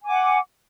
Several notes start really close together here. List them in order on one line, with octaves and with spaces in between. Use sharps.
G#5 D6 F#5